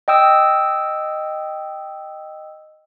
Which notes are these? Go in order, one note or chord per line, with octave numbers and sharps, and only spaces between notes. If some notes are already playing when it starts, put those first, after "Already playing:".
D#5 G5 D#6 E6